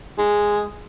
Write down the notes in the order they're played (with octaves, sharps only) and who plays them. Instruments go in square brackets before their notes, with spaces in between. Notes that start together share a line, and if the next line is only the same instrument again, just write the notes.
[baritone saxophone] G#3